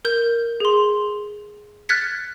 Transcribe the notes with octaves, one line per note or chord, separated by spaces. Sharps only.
A#4 G6
G#4 C6
F6 F#6 G#6 A6 B6 C#7